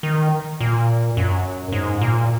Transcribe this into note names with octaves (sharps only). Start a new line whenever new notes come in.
D#3
A#2
F#2
G#2
A#2